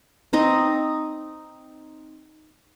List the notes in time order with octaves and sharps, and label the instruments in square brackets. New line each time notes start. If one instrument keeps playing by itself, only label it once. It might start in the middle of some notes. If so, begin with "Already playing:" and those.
[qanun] C4 D#4 D#5